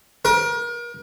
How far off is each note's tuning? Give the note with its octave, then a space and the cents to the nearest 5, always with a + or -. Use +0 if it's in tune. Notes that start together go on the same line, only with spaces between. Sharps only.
A#4 +35